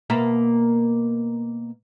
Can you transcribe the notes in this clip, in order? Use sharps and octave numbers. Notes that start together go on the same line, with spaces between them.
B2 A#3 E5